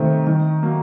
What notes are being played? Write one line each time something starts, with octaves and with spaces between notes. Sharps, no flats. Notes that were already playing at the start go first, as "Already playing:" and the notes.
Already playing: C3 D#3 A3 C4
D#3
F#3 A#3